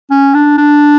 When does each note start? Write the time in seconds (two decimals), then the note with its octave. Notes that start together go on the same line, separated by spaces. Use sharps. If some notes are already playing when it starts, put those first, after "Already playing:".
0.11 C#4
0.34 D4
0.58 D4